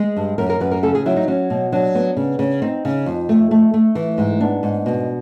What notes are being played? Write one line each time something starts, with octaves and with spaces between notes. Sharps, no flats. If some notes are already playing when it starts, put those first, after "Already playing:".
Already playing: G#3 G#4
G2
F#2 A#4
A#4
F#2 B4
A#4
C#3 A4
G#4
F#3 E4
D#4
F#3 C#4
B2
F#3 D4
B3
C#3
C#3
C4 D#4
C#3
F2
A3
A3
A3
E3
G#2
B3 D4
G#2
B2